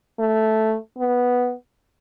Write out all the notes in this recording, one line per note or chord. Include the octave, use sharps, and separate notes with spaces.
A3
B3